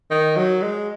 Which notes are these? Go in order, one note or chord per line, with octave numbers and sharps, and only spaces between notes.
D#3
F#3
G#3